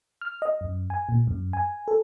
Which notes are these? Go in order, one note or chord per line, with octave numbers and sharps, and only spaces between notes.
F6
D#5
F#2
G#5
A#2
F#2
G#5
A4